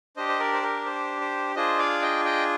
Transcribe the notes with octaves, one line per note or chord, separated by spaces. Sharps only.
D4 G4 C5 D#5
C5
A#4 D5
C5
A#4
C5
C5
D4 F4 G#4 C5 D#5
D5 F5
D#5 G5
D#5 G5